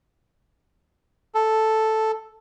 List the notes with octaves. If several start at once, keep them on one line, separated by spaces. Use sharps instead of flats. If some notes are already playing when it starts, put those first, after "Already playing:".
A4